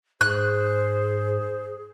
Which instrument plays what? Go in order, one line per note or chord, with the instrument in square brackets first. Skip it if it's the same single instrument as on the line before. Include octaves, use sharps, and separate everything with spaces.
[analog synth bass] G#2 [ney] G#4 [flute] C5 [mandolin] F#6